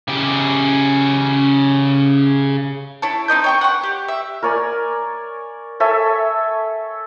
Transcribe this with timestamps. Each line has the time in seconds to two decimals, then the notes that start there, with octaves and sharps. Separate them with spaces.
0.08 C#3 G4
3.02 E4 C#5 A5
3.28 C4 D#4 D#5 G6
3.44 C#5 G5 C#6
3.61 F#5 C#6
3.83 G4
4.08 E5
4.43 A#4 C#5 D5 G#5
5.80 A4 C#5 E5 G#5